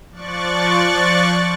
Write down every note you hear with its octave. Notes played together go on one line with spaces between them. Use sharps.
F3 D5 C#6 F#6 A6